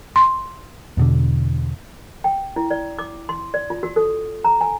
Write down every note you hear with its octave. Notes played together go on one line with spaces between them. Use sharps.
C6
E2 B2 D3
G5
E4
D5
D6
C6
D5
F4
F#4
A4
A#5
G#5